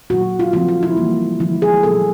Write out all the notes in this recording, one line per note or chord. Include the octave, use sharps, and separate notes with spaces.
A#2 F#3 A3 F#4
F4
C#3 F3 A3 C4 F4
F4
E4
E3 G3 A#3
D3 F3 G#3 E4
G#4
A#2 F#3 B3 A4